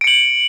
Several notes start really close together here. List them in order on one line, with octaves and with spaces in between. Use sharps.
D7 C#7 F#7